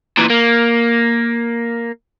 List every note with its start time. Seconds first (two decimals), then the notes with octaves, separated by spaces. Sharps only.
0.18 A#2 E3
0.30 A#3